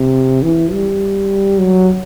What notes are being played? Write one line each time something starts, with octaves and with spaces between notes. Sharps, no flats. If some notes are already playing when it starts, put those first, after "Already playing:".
Already playing: C3
E3
G3
F#3